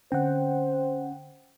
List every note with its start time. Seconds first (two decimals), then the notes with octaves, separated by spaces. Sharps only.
0.12 D3 C4 C#4 C5 F#5 G5